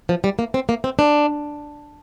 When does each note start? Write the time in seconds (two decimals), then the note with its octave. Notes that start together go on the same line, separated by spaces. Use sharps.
0.09 F3
0.24 G3
0.39 A#3
0.54 C4
0.69 A#3
0.84 C4
0.99 D4